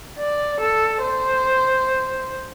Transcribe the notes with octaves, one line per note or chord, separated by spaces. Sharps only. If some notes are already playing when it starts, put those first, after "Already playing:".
D5
A4
C5